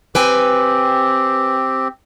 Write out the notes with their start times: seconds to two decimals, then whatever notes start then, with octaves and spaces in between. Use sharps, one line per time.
0.15 C4 G4 B4 G5 G#5